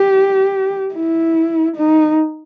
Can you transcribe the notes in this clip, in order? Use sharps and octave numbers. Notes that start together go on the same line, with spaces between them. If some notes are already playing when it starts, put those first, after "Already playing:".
Already playing: G4
E4
D#4